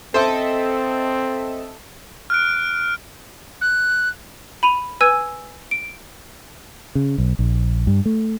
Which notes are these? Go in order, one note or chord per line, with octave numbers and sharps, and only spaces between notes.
C4 A4 C5 D#5 E5 G5
F6 F#6 D7
F#6
B5 D#7 F7
B4 G#5 E6 G#6 D#7
D7
C#3
B1
A#1
G2
A3